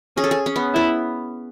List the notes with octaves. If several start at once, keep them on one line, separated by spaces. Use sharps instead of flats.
C#4 G#4
A4
G#4
C#4
B3
B3 E4